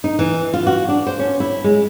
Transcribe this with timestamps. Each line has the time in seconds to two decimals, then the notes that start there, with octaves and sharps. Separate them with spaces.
0.04 D#4
0.19 E3
0.54 F4
0.67 F#4
0.89 D4
1.07 C5
1.19 C#4
1.40 E4
1.64 G#3